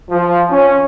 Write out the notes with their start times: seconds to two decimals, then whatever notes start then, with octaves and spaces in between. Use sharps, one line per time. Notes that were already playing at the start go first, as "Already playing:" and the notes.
0.10 F3
0.50 C#4